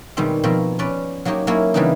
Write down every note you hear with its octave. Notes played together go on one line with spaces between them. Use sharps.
B2 D#3 G3 G#3 C4
B2 F3 C4 A#4
C#4 B4 D5
F#3 A#3 D#4 G4 C#5
F#3 A#3 C#4 E4 C#5
C#3 E3 G3 B3 D4 D#4